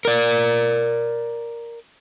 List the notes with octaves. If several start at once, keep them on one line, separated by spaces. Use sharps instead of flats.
A#4 D5